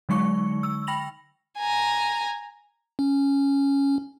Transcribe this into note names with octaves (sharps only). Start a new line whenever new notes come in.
D3 F#3 G#3 D#4 C#6 C#7
E6
G5 B5 A#6 F7 F#7
G#5 A#5
C#4